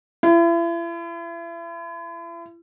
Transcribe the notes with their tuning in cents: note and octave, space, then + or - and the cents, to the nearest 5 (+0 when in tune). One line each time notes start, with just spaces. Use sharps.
E4 +40